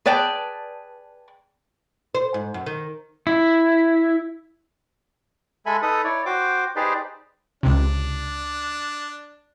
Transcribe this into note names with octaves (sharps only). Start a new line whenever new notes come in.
G#4 B4 D5 G5 A5
C5
G#2
F#2
D#3
E4
G#3 A4 E5 G#5 B5
D#4 A4 B4 D#6
E4 C#5 D5
F#4 C5 G5 D6
D#4 G4 G#4 B4 C5 D5
C#2 C3 D4